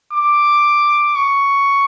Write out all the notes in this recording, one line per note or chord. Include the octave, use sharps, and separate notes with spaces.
D6
C#6